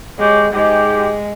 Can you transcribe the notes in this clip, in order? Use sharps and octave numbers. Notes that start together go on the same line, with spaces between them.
G#3 G4 C#5
G#2 G#3 G4